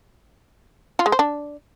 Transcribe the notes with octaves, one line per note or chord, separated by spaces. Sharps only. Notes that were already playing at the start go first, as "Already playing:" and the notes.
F4
G#3
C5
D4